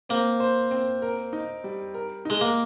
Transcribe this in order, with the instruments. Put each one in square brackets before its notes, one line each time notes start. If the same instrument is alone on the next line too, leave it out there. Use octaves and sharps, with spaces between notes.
[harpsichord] A#3 [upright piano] C4
[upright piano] C5
C4
A#4
D#4
G3
A#4
[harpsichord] G#3 [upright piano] D#4
[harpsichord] A#3